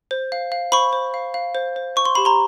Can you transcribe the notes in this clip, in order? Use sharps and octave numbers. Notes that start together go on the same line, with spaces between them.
C5
F5
F5
C5 B5 C#6
C5
F5
F5
C5
C5
C5 C#6
C6
G4 B5
A#5 C6